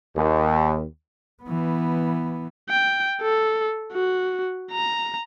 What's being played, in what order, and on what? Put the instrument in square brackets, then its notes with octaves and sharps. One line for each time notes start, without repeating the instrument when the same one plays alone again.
[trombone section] D#2
[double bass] E3 B3
[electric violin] G5
A4
F#4
A#5